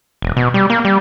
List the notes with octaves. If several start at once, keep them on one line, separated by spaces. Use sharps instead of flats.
E1
B2
G3
A#3
G3